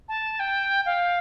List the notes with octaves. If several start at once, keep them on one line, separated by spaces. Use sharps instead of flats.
A5
G5
F5